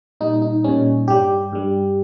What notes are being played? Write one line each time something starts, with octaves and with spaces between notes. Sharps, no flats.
A#2 G3 D#4
D#4
A#2 G3 C#4
G2 G3 G4
G2 G3